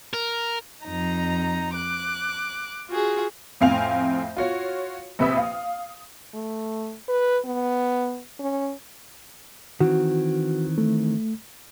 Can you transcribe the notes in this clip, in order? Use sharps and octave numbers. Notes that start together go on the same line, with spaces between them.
A#4
F2 D#4 A#5
D6 F#6
F4 F#4 G#4
F2 A2 C4 F5 G#5 F7
F4 F#4 C#5
A#1 C3 B4 E5 D#6
F5
A3
B4
B3
C#4
D#3 E3 C4 F#4
A3